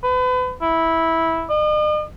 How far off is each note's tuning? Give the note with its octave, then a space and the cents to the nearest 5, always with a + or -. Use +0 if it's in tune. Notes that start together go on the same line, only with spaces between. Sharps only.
B4 +35
E4 -10
D#5 -45